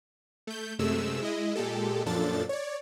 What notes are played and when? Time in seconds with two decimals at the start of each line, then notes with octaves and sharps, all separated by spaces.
0.47 A3 G6
0.79 F#2 C3 G#3 A3 E6
1.20 G#3 E4 D#5
1.56 A#2 G#3 G4 A4
2.06 F#2 A#2 F3 D4 A4 A6
2.49 C#5 D5